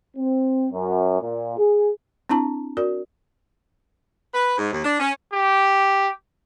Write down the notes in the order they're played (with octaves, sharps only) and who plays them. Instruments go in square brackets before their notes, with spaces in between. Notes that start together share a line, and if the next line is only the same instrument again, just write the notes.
[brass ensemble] C4
F#2
A#2
G#4
[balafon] C4 D4 E4 A5 A#5
F#4 A#4 D5
[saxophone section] B4
G#2
D#2
D4
C#4
[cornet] G4